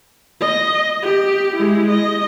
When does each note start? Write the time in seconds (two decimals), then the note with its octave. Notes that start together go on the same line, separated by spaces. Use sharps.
0.40 D#5
1.02 G4
1.56 G#3 E4
1.89 D#5